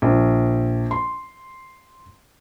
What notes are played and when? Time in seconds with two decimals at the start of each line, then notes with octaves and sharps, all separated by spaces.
0.02 A#1
0.91 C6